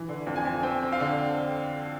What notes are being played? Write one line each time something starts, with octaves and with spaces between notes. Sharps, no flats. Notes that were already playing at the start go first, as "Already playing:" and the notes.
Already playing: E3
D3
F2
G#5
F2
C4 G5
C4
F5
D3